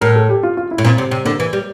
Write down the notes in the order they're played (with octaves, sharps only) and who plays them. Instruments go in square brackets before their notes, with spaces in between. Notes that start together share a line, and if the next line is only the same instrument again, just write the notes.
[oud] A2 [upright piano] A#4
[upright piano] A4
G4
F4
F4
E4
[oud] A2
[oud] A#2 [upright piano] C4
[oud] C3
C3
[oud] D3 [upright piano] A#3
[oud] E3
G3